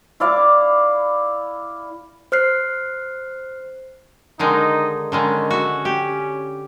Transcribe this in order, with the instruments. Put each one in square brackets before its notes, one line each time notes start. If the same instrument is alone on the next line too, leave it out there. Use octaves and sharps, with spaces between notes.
[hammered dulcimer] E4 D5 F5 D6
[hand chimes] C5 F6 F#6 C7
[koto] D3 D#3 G#3 [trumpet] D#4
[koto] D3 D#3 G#3 [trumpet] C#4
[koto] F#4 E5
G4